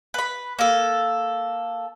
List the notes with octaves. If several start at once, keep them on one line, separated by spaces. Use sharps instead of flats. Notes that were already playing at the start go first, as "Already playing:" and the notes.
B4 B5
A#3 A4